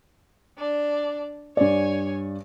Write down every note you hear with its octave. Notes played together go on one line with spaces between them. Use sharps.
D4 D5
G2 C#5 D5 G#5